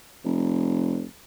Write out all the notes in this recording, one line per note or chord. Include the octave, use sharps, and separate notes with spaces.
F1